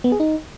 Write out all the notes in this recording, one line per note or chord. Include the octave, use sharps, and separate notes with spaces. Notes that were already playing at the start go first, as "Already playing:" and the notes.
B3
G#4
D#4